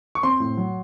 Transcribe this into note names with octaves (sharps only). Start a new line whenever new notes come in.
C#6
C4 C6
A2
F#3